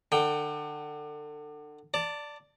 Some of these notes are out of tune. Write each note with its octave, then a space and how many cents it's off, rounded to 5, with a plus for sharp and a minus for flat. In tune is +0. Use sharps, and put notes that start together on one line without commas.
D3 +30 G5 +0
D5 -5 A5 +25